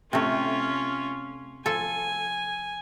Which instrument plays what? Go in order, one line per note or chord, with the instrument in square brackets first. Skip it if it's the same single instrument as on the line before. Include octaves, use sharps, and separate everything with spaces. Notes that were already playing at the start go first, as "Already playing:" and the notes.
[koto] C3 A3 [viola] C#4 F4
[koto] F3 A4 [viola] G#5